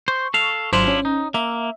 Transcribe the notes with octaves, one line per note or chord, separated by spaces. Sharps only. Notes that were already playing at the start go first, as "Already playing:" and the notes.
C5 C#6
A4 F5
G#1 F#3 D4 E4 F4 C5
C#4
D#4
A#3 E5